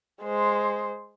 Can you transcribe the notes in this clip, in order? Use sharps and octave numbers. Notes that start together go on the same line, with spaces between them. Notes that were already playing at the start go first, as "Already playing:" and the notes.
G#3 C5